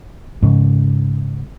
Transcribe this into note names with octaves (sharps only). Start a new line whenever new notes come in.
G#2 C#3